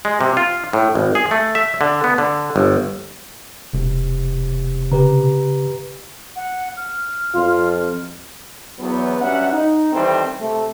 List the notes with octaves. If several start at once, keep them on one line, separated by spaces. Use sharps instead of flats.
G#3
C3
F4
A2
G#1
G#4
A3
E5
D3
B3
D3
G1
E1 C3
C#3 G4 B4 A#5
F#5
F6
F2 F4
E2 F#3 B3
G2 F#3 G3 C#4 E5 F#5
D#4
D#3 E3 G3 C4 A4 C5
C3 A3